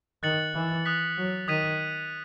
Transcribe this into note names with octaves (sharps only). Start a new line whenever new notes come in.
D#3 F#6 A6 C#7 F#7
E3
D#6 F#6 B6
F#3
D#3 D#6 G#6 B6 D#7